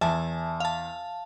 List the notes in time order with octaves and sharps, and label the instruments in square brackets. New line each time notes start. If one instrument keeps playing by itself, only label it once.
[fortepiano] E2 [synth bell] E5 G#5 A5
[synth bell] F5 A5